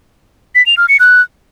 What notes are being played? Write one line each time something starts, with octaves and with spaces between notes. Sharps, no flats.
B6
F7
F6
C#7
F#6